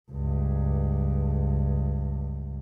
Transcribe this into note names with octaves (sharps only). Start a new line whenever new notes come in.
C#2 G2